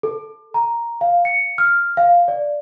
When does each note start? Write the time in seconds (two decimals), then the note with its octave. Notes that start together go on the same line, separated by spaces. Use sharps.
0.03 A4
0.54 A#5
1.01 F5
1.25 C#7
1.58 F6
1.97 F5
2.28 D5